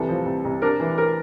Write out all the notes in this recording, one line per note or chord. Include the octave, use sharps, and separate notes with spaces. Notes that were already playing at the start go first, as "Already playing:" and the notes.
Already playing: C2 E3 A4
F3
C2
C2
D4 A#4
E3
A#4